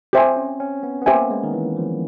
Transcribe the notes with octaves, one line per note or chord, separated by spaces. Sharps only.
C4 G4 C5 E5 G#5
C#4
C#4
B3
B3
A#3 G4 C5 E5 G#5
G#3
D#3
E3
F3